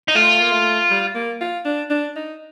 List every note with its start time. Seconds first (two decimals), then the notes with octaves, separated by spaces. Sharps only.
0.08 D#4
0.15 A3 F4
0.41 A#3
0.52 A3
0.91 G3
1.15 A#3
1.41 F4
1.65 D4
1.90 D4
2.16 D#4